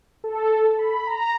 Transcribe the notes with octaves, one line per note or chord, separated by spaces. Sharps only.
A4
B5
A#5